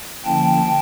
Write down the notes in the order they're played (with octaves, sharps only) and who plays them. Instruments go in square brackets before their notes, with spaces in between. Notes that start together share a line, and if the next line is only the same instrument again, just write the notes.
[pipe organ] D3 F3 A#3 C#4 E4 G5 A5